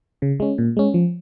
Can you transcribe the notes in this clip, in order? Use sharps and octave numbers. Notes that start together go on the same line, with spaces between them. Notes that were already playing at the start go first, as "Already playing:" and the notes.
C#3
G#3 C#4
A#2
G#3 C#4
F3